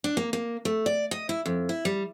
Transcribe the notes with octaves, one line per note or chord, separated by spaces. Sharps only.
D4
A#3
A#3
A3
D5
D#5
E4
F2
E4
G3